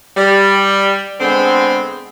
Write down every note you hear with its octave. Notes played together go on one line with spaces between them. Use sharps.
G3
D3 G#3 B3 C4